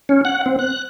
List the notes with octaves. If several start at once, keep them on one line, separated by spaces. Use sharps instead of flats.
C#4
F#5
C4
F#6